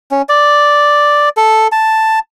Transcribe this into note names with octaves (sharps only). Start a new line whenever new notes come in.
C#4
D5
A4
A5